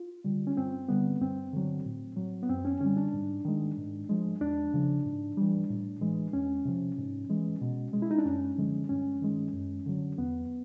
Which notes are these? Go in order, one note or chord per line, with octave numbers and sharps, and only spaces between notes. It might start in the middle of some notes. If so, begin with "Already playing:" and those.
Already playing: F4
D3 G3
C#4
G2 C4
D3 G3 B3
G2 C4
D3 F#3
A2
F#3
B3
F#2 C4
C#4
D3 G3 C#4
D4
G#2
D#3 G#3
G#2
F3 G#3
E2 D4
C#3 F3
G#2
E3 G3
A2
E3 G#3
E2 C#4
C3 F3
G#2
E3 G#3
B2
G#3
E4
D#4
D4
F#2 C#4
D3 F3 G#3
G2 C#4
D#3 G#3
F#2
D3 F#3
E2 B3